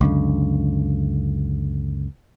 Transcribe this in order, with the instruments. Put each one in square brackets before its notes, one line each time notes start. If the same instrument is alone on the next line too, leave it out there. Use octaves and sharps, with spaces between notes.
[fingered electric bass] C#2 F#2 D3